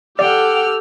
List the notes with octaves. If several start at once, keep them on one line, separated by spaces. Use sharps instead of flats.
G4 A4 D5 F#5 G5 E6 F6